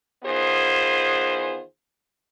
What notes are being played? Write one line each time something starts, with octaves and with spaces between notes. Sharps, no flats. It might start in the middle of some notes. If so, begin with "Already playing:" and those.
E2 D#3 B3 F4 G#4 C5